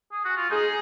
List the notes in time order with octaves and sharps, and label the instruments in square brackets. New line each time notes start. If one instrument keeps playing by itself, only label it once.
[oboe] G#4
F#4
F4
[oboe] D#4 [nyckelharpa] G#4